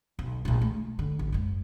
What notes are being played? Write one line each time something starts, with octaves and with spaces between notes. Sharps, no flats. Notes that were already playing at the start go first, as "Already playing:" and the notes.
B1
A#1 A#2
A3
D3
A1
F#1 G#2